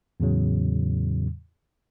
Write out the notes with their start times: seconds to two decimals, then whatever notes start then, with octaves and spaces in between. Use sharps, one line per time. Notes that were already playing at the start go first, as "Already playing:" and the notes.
0.20 E2 A2 C#3 F#3